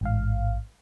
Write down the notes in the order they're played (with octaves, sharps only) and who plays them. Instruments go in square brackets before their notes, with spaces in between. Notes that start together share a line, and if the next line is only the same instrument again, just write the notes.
[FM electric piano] A1 G#2 F5